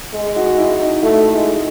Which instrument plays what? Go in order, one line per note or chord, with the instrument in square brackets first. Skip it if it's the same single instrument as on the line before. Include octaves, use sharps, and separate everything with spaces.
[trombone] G#3
[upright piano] F#4
E4
D#4
[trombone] A3 [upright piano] E4
[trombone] G#3